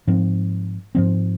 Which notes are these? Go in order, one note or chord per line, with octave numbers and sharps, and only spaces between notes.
G#2 F3 C4
G#2 F3 C4